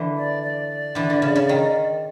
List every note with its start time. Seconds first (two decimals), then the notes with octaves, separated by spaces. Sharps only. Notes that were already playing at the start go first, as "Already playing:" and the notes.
Already playing: D3 E3
0.17 D5
0.43 D5
0.95 D3 E3
1.10 D3
1.22 C#3
1.35 C#3
1.49 D#3